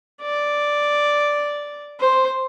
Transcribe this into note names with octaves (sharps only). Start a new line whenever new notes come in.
D5
C5